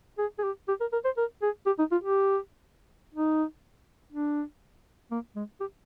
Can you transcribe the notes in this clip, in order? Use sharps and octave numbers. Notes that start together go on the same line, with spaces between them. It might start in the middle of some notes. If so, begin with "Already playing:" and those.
G#4
G#4
G4
G4
A#4
A#4
C5
A#4
G#4
G4
D#4
F4
G4
D#4
D4
A#3
G#3
G4